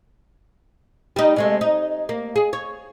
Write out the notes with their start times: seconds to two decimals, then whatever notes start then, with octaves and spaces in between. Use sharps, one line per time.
1.16 G3 D#4
1.36 C3 G#3 A3
1.61 D#4
2.09 A#3
2.36 G#4
2.53 C#5